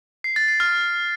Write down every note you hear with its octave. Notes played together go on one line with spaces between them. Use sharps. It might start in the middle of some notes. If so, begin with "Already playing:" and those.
C7
A6
C7
F6